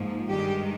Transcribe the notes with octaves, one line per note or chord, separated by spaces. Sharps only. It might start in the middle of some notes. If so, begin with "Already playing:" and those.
Already playing: G#2 F3 A#3
G2 D#3 G#3 G4